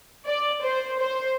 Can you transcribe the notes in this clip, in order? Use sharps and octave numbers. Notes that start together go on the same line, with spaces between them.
D5
C5
C5